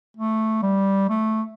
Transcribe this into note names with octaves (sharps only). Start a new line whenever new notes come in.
A3
G3
A3